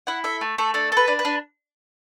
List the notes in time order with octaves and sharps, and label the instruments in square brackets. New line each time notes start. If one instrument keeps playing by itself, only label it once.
[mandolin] E4 F#5
A4 E5
A3
A3 A4
D4 A4
A4 B4
D4
B4
D4